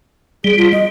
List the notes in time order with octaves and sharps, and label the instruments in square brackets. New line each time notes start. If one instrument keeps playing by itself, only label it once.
[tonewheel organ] G3 [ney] G#4
[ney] F4
D#5